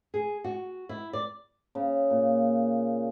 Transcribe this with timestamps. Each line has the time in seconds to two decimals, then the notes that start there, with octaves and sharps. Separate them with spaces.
0.14 G#4
0.44 F#4
0.89 E4
1.13 D5
1.75 C#3
2.10 A#2